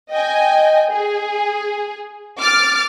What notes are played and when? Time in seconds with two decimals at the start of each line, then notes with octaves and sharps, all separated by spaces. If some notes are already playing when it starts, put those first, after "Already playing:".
0.11 D#5 G5 G#5
0.90 G#4
2.39 D6 F6 A6